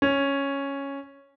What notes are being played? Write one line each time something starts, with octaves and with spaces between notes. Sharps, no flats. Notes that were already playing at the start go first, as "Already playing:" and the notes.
C#4